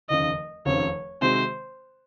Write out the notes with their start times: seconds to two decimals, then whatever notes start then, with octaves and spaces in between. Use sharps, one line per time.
0.10 F1 D#2 C#3 D#5
0.66 F1 D#2 C#3 F3 C4 C#5
1.22 C3 D#3 G#3 C4 F#4 C5